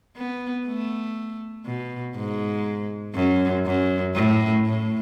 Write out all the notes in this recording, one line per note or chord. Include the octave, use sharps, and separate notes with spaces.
B3
A3
B2
G#2
F#2
F#2
A2
A2